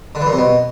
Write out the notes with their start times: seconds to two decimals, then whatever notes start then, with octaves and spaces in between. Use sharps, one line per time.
0.15 D3
0.21 E3
0.26 A#2
0.32 C3
0.38 B2